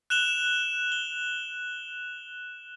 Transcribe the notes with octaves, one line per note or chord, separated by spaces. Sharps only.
F#6 E7 F7 G7
G7